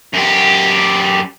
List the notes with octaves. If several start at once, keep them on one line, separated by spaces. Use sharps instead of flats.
F#2 G4